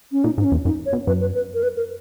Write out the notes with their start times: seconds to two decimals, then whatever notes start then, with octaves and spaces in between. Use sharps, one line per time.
0.12 C#4
0.24 A#2 D#4
0.38 G#2 D#4
0.44 C#4
0.52 E2
0.65 F#2 D#4
0.86 C#5
0.93 B2
1.07 F#2 B4
1.21 B4
1.35 B4
1.54 A#4
1.63 B4
1.77 A#4